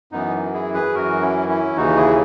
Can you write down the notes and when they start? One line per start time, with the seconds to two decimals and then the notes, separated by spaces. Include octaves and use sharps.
0.12 F#2 E3 B3 D#4
0.53 E4 G#4
0.74 G#4 B4
0.94 F#2 E3 F#4 A#4
1.22 C#4 E4
1.49 C#4 E4
1.76 D#2 C#3 E3 D#4 F#4
1.97 E4 G#4